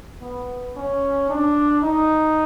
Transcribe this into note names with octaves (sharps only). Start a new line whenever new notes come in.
B3
C#4
D4
D#4